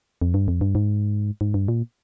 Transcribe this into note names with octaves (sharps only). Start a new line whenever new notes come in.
F2
G2
F2
G2
G#2
G#2
G2
A#2